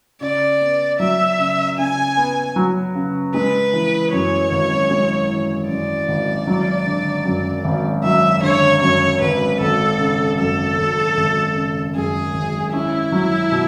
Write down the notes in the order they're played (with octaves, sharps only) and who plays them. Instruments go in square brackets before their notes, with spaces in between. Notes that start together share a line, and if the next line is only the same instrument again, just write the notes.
[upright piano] C#3 [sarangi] D5
[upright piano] B3
[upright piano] F#3 [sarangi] E5
[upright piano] C#3
[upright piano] C#3 [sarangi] G#5
[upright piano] B3
F#3
C#3
[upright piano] G#3 [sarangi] B4
[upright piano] E3
[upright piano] F#2 [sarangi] C#5
[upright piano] G#1
G#3
E3
[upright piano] F#2 [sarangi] D5
[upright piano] G#1
F#3
D3
F#2
G#1
[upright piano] F#3 [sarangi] E5
[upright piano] D3 [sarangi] C#5
[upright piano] F#2 [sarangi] C#5
[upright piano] G#1 [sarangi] B4
[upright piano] G#1 [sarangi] A4
[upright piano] C#3
[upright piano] F#2 [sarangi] A4
[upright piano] G#1
G#1
C#3
[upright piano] F#2 [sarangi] G#4
[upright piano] G#1
[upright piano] C#4 [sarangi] E4
[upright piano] F#3
B2